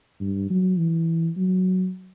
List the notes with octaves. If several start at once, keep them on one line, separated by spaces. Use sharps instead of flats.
G2
F#3
E3
F#3